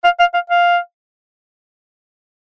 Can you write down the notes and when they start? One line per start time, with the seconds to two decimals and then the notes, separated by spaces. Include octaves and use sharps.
0.04 F5
0.20 F5
0.34 F5
0.50 F5